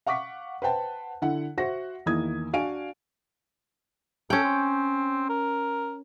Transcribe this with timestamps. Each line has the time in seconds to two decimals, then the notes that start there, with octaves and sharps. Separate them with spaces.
0.06 F5 F#5 C#6 D6 B6
0.62 B4 C5 F#5 G5 A5
1.22 D3 E4 F#5
1.58 F#4 C5 E5 F#5 A#6
2.06 E2 D#3 A#3 E4 D#6 G#6
2.53 D4 F#4 F5 G#5 D7
4.30 C#4 A4 G5
4.44 C4
5.29 A#4